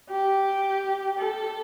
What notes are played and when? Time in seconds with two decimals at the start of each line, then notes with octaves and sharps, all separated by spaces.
0.11 G4
1.19 A4